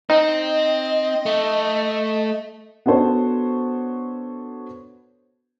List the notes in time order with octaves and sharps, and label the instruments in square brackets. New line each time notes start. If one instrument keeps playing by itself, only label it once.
[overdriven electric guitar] C4 [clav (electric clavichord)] D#4 [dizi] D#5
[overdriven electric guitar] A3
[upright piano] B3 D4 F#4 A4 C5 C#5